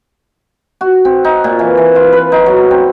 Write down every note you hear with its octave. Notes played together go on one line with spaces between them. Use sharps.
F#4
C4
D#4
A#2
E3
E3
F4
B4
D#4
F#3
C4